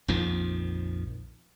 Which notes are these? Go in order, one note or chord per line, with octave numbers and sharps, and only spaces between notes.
A#1 F2 D#3 F3